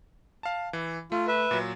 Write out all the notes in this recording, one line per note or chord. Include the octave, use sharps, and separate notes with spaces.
F5 A5
E3
A3 F4
B4 E5
A#2 F#3